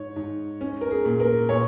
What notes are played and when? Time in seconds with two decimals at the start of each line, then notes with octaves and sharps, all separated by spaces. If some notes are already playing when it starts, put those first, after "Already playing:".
Already playing: G#2 C#5
0.16 G#2
0.61 C#4
0.81 A#4
0.91 G#4
1.05 A#2
1.20 A#4
1.49 A#2 C#5